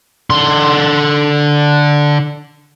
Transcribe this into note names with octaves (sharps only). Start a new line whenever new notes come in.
D3 C6